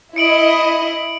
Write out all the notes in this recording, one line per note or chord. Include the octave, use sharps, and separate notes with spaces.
E4 D#5 C#7 D7 F#7